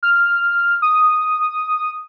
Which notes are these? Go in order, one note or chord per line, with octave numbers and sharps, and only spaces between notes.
F6
D#6